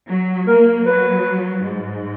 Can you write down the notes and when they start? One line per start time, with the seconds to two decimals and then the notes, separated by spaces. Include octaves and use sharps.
0.09 F#3
0.47 A#3 A#4
0.85 F#3 B4
1.62 G#2